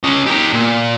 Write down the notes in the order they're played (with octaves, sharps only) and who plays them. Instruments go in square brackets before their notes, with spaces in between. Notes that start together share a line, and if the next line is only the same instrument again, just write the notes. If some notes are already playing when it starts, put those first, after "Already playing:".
[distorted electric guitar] C#4 D#5
G4 A#4
A#2